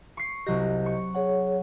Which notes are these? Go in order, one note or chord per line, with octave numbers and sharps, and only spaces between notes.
C#6 C7
C2 F#3 G4 D#5 A#6
C#6
G#4 C#5 F#5